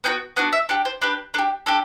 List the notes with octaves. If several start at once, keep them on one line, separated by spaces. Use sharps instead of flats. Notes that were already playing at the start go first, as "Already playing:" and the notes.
B3 D4 F#4 G5
B3 D4 F#4 F#5
E5
D4 G4 F#5
C5
D4 G4 B4
D4 G4 A4
D4 G4 A4